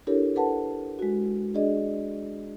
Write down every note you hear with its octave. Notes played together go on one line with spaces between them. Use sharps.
D4 E4 G4 A4 A#4 C#5
A4 B4 F#5 A5
G#3 F#4
D4 G#4 D5 D#5